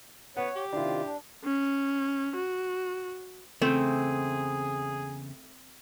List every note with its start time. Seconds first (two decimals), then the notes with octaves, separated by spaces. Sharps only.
0.37 B3 C#5 F#5
0.56 G4
0.73 C3 D#3 D4 E4 F4
1.03 D4
1.44 C#4
2.36 F#4
3.62 E2 A2 C#3 A3 C4 G#4